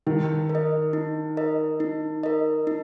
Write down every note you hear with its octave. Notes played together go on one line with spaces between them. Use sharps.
D#3 D#4
A#4
D#5
D#4
A#4 D#5
D#4
A#4 D#5
D#4